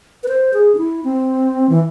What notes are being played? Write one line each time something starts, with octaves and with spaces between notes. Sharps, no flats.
B4
C5
G#4
D4
E4
C4
E3